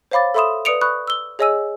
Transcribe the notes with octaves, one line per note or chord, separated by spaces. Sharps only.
C5 C#5 F5 B5 D6 A6
A4 E5 B5 C6 D#6 E7
B4 D5 D#6 C#7 D7 F7
B5 C#6 D#6 F#6
E6 G7
G#4 C#5 D#5 G#5 E6 D#7